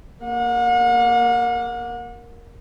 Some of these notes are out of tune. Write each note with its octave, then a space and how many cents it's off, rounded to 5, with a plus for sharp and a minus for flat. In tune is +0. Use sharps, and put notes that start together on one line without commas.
A#3 +0 F#5 -40